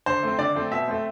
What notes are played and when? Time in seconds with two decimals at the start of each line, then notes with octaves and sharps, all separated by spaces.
0.06 D3 C5
0.23 A3 C4
0.39 D3 D5
0.55 A3 C4
0.72 B2 E5
0.88 A3 C4